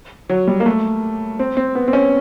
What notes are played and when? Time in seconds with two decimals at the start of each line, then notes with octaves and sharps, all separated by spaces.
0.29 F#3
0.48 G3
0.60 A#3
0.66 A3
1.39 C4
1.57 C4
1.75 B3
1.88 C4
1.93 C#4